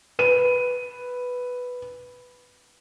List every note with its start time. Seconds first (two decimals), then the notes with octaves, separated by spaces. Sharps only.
0.19 B4 D#7